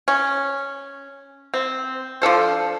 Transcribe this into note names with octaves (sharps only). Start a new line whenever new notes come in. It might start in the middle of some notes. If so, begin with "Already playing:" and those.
C#4
C4
F3 D4 A4 C5